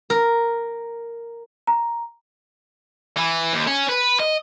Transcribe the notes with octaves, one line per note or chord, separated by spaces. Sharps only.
A#4
A#5
E3
D#2
C#4
B4
D#5